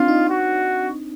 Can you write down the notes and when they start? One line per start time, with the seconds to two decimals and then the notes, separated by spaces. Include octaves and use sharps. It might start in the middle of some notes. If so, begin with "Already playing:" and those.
Already playing: C4 D4 F4
0.08 D#4
0.30 F#4